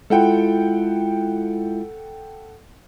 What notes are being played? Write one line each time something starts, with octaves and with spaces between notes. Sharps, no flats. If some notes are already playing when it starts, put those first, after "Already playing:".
G#3 E4 F4 A4 F#5 G5